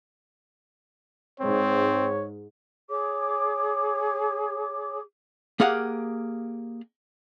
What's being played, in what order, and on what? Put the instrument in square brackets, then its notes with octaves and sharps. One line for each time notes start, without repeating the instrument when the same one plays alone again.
[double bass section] G#2 [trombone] C4 [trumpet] C#5
[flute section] G#4 C#5 D6
[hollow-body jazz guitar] A#3 G4 G#4 F5 F#5